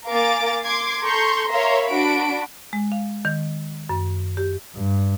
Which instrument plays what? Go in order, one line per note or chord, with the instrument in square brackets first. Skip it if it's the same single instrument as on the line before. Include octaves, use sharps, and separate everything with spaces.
[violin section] A#3 A#4 F5 G#5 D6 A6
C6 D6 G#6 C7
A4 A#5 C6 C#6 G6
A#4 C#5 E5 F5 A#5 C6
D4 F#4 B5 D7
[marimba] G#3
F5
D#3
F#2
G4
[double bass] G2